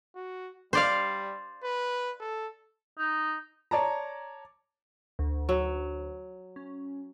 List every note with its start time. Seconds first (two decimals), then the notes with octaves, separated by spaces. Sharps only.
0.16 F#4
0.73 G3 C5 D5 F5
1.64 B4
2.20 A4
2.98 D#4
3.71 C#5 D5 A5 A#5
5.19 D2
5.49 F#3
6.56 C#4